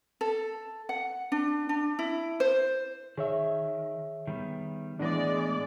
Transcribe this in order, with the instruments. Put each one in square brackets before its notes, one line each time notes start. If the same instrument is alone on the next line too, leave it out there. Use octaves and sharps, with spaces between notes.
[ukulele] A4
F#5
D4
D4
E4
C5
[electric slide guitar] D#3 [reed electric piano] G#4 C#5 E5
[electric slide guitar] D#3 G3 B3
[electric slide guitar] A2 B3 D#5 [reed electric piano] E3 D4 [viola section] G#3 D5